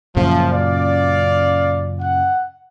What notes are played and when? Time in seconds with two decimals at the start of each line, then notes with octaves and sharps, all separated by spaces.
0.16 F#2 A#2 C#3 F3
0.52 D5 F5
2.00 F#5